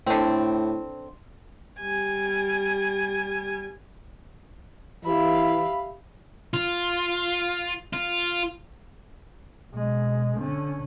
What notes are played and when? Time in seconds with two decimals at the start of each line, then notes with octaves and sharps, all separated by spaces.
0.07 A2 D3 C4
1.80 G3 G#5
5.05 E3 G4 E5 F5 B5
6.54 F4
7.93 F4
9.71 B2 G#3
10.36 D3 C#4